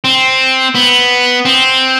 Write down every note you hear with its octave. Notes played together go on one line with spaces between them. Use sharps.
C4
B3
C4